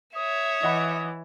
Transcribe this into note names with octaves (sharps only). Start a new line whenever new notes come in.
C#5 E5 D#6
E3 D#5 F#5 B5